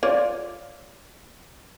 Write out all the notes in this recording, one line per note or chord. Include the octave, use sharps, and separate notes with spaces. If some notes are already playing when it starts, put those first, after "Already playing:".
F4 C#5 D5